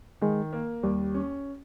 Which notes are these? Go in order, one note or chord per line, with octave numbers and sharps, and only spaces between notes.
D#3 G#3
A#3
D#2 G3
C#4